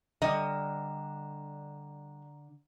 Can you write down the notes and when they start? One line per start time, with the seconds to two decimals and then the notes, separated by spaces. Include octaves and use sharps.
0.22 D3 G3 D#5 A#5